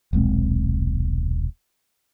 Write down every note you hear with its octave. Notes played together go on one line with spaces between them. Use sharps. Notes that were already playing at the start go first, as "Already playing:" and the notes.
D#1 B1 G#3 C4